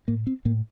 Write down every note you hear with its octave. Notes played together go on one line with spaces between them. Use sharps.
A2 A#3
C4
A2 A#3